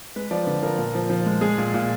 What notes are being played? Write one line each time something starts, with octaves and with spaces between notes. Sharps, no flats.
G#3 B4
F3 D5
D3 B4
F3 A#4
A#2
F3
F3
G#3
G#3 G#4
A#2
A#2